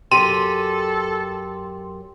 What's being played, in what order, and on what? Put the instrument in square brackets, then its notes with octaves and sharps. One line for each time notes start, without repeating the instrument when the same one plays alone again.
[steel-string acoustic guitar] F#2 G4 G5 [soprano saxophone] A4 [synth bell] C6 [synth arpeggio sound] D#7